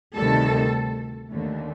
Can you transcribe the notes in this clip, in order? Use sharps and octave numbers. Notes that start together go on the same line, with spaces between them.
D2 C3 D#3 G3 A4
D#2 D3 A3